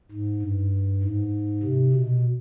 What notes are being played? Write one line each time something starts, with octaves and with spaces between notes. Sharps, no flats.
G#2
G2
G#2
C3
B2